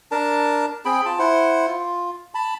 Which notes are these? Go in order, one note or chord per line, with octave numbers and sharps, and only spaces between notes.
D4 A#4 A5
C4 G#4 G5 B5
F4 A5
E4 C5 F#5
F4
A5 B5